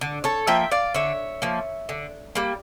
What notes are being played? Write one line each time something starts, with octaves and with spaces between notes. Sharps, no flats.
D3
A4 C#5
F3 A#3 E5 G5
D5 F5
D3 C#5 E5
F3 A#3
D3
G3 A#3